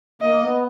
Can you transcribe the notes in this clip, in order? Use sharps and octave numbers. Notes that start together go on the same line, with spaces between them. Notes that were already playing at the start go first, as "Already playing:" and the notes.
A#3 D#5
B3